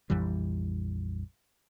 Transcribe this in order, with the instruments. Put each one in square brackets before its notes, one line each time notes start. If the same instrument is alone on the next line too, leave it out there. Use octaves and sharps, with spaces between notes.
[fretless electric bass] A#1 F2 E3 G3